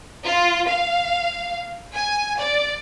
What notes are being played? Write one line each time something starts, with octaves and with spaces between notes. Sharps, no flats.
F4
F5
G#5
D5